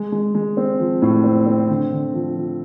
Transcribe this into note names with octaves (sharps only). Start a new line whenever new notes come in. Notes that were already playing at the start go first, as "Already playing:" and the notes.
Already playing: G#3
G#3
G#3
C4
F3
A2
C4
C4
D3
D3
F3
F3